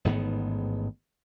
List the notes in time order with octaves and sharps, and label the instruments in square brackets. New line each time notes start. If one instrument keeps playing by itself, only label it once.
[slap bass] A1 G#2 D#3 B3